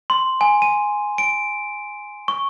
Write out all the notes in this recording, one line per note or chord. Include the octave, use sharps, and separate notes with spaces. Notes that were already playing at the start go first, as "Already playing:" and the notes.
C6
G#5
D#7
D7
C#6